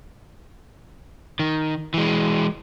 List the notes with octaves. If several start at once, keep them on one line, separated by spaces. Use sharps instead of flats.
D#3
E3 G#3